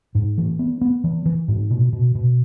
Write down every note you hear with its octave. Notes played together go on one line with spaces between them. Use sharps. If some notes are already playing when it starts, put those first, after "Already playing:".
G#2
E3
B3
B3
E3
E3
G#2
B2
B2
B2